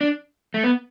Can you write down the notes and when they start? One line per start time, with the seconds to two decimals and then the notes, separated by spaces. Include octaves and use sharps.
0.01 D4
0.54 A3
0.64 B3